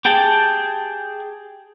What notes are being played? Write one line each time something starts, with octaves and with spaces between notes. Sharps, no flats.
G4 G#4 G5 A5